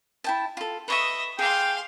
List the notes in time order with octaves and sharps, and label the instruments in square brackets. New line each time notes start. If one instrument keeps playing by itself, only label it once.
[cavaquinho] E4 G5 A5
F4 A4
[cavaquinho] B4 C#6 D#6 [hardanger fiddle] D#5 E5
[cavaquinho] G#4 D6 [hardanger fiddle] F5 C6 [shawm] G5